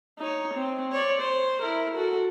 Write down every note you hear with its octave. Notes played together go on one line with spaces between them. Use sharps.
D#4 C#5
C4
C#5 D5
C5
E4 A#4
F#4 A4